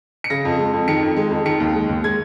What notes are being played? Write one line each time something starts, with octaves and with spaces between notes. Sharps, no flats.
C#7
C#3 A#6
F2
G#3
F2
D#3 C#7
F2
G#3
F2
D#3 C#7
D#2
G#3
D#2
G#3 G#6